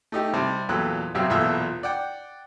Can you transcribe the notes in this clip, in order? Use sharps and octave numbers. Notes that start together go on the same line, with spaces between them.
A3 D#4 G4
C3 G3 A5
E2 A#2 F#3 A4 G5 F#6
B1 C3 F#3 G4 E5 F5
B1 E2 A#2 F4 A4 E5
D5 F#5 G5